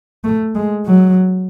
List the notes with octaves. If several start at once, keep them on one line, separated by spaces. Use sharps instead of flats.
A3
G#3
F#3